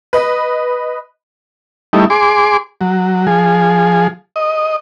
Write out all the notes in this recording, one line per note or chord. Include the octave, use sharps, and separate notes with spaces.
B4 D#5
G3 A3 D#4 E4
G#4 C6 D6
F#3
F3 G#4
D#5